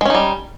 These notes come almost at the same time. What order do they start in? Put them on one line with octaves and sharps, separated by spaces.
G#3 C#4 D#4 G3